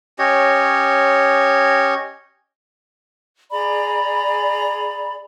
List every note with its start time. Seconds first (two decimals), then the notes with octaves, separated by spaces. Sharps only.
0.19 C#4 G4 C#5 D#5
3.51 G#4 D5 A#5 B5